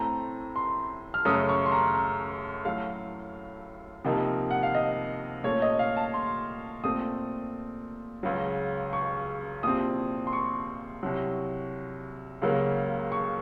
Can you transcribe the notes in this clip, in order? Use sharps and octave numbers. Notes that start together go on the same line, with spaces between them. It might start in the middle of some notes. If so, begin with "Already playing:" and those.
Already playing: A2 A3 C4 A#5
C6
F6
F#2 C#3 A3 C#4 D#6
C#6
C6
A#5
A#5
A2 F#3 A3 F5
F2 C3 F3 A#3 D#4
F#5
F5
D#5
A#2 A3 C#4 C#5
D#5
F5
A5
C6
A#2 A3 C4 D#6
C#2 C#3 F#3
C#6
C2 A#2 F3 C4 D#6
C6
C#6
C2 C3 F#3
C#2 C#3 F#3 A#3
C#6